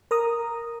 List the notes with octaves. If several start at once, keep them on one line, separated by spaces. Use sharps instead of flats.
A#4 A#5 D#6